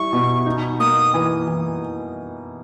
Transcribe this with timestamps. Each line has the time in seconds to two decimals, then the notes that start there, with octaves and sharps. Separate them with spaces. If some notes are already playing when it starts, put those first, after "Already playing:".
Already playing: G3 E4 C#6
0.13 B2
0.46 D#4
0.80 A#3 D#6
1.14 E3
1.48 E3